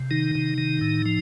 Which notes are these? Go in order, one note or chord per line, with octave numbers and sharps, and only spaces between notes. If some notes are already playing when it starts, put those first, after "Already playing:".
Already playing: C3
D#3 D#4
C3
D#3
A2
F3